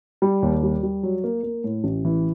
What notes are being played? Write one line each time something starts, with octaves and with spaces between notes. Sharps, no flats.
G3
D#2
G3
G3
F#3
A#3
A#3
A2
A1
E3